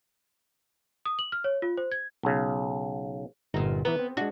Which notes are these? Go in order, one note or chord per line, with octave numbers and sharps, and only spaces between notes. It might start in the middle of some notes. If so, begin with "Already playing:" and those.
D#6
F#7
F6
C#5
F4
C5
G#6
B1 C#3
G1 A#2 D#4
E3 B3 B4 A#5
C4
G#3 D4 F#4